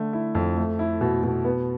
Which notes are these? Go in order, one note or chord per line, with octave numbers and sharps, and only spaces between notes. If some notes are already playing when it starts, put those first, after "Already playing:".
Already playing: D3 A3
E4
F2
A3
E4
B2
B2
B3